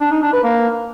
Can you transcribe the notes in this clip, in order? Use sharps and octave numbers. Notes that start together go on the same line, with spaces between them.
D4
D#4
D4
B4
A#3